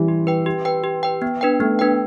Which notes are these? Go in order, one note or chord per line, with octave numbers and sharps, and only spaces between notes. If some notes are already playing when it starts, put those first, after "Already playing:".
Already playing: E3 G3
G4
B4 G5
G4
B4 G5
G4
B4 G5
B3
D4 B4 G5
A3 B3
D4 B4 G5